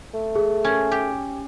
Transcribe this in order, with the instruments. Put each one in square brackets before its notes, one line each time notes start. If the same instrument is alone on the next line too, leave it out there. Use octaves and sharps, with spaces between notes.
[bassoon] A3
[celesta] G#4
[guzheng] C#4
G4